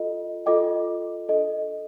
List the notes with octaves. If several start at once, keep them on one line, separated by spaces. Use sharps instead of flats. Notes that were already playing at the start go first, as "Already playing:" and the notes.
Already playing: F4 A4 D#5
F4 A4 D#5 G5 D6
D4 A4 D#5